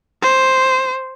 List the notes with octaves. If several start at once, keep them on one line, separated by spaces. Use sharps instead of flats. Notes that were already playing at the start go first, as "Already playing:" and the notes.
C5